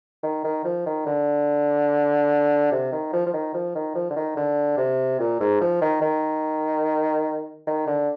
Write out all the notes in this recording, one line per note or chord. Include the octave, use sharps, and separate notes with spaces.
D#3
D#3
F3
D#3
D3
C3
D#3
F3
F3
D#3
F3
D#3
F3
D3
D#3
D3
C3
A#2
G#2
F3
D#3
D#3
D#3
D3